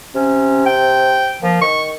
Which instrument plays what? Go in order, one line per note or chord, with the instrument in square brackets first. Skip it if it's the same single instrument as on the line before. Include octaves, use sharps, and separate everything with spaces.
[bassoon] C3 [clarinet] C#4
[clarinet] G5
[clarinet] F3 [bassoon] A#3
[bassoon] D#3 [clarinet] C#6